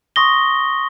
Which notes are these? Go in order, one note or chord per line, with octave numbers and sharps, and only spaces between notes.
C6 C#6 D#6 A#6 G7